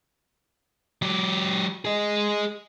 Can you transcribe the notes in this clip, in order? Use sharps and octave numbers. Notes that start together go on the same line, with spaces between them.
F#3 G4
G#4 D#5